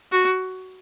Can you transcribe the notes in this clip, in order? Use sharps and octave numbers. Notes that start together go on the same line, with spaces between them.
F#4